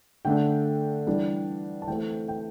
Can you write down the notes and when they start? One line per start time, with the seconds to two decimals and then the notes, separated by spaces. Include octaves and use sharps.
0.25 D3 A3 D4 G5
1.07 E3 G3 D4
1.82 A5
1.87 E3 A3 C4 G5
2.28 G5